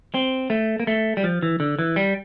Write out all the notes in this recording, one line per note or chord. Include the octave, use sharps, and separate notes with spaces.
C4
A3
A#3
A3
G3
F3
E3
D3
E3
G3